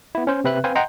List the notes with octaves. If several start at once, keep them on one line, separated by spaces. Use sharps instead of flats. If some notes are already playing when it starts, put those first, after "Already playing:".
B3 E4
C#4 C5
C3 C4 B4 E5 F#6
C4 B4 C5 F5 G#5
D#5 F#5 G5 A#5 C6 G6